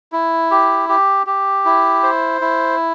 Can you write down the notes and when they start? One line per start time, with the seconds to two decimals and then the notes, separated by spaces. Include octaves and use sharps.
0.12 E4
0.51 G4
0.89 G4
1.27 G4
1.65 E4
2.03 C5
2.41 E4